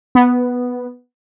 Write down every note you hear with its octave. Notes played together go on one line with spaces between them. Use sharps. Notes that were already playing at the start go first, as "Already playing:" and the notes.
B3